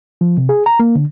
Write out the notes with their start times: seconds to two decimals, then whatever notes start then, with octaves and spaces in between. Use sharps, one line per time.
0.21 F3
0.37 C3
0.49 G#4
0.66 A#5
0.80 A#3
0.95 D3